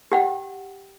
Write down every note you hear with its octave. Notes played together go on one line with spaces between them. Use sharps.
G4 F#5 G5